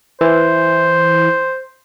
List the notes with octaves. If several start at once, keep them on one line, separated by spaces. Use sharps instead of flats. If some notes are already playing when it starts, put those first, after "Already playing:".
E3 C5